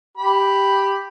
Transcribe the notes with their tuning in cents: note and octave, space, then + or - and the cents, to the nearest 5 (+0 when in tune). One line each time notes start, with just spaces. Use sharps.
G4 +0 B5 +0